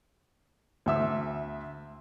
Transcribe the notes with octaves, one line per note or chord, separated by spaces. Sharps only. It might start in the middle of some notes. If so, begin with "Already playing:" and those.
D2 E5 E6